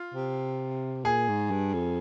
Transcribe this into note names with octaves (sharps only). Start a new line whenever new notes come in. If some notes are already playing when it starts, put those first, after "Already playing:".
Already playing: F4
C3
A#2 G#4
G#2
G2
F2